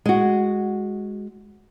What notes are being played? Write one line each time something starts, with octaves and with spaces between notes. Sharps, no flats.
G#3 F#4